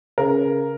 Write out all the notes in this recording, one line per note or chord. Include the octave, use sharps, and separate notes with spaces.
C#3 A#4